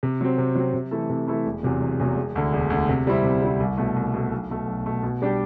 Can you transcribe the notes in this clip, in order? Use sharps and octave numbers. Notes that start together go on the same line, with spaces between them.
C3
F#3 C4
C3
F#3 C4
C3
E3 A3 E4 A4
C3
E3 A3 E4 A4
E1
E2 C3 F#3
E1
E2 C3 F#3
E1
D2 D3
E1
D2 D3
C3
G3 C4 E4
C3
G3 C4 E4
C2
B2 A3
C2
B2 A3
B1
B2 A3
B1
B2 A3
B2
G3 D4 G4